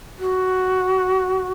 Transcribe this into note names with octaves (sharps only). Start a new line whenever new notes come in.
F#4